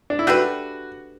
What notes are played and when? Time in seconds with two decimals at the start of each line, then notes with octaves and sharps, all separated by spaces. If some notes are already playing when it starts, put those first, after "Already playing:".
0.10 D4
0.19 E4
0.27 A3 D4 F#4 G4 B4